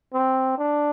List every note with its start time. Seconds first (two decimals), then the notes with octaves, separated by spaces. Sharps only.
0.14 C4
0.58 D4